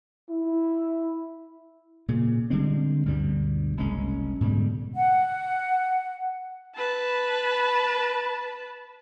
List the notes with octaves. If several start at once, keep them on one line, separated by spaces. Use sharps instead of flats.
E4
A#2 C#3
D3 G3 G#3 C4
D2 G2 B2 G3
F#1 C2 G#3 C#4
G#2 B2 D3 G3
F#5
B4 A5